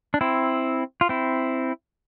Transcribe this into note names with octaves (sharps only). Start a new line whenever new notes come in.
D4
C4 E4
F4
C4 E4